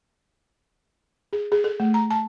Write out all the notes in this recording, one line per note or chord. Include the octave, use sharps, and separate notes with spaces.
G#4
G#4
A4
A3
A#5
A5